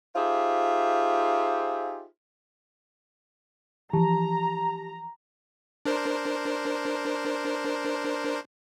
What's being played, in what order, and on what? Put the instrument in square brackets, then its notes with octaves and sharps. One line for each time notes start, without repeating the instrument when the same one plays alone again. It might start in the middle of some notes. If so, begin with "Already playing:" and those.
[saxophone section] D#4 F4 G4 G#4 C5 E5
[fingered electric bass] E3 F3 [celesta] G4 A5 [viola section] A#5
[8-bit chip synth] D4 A#4 C5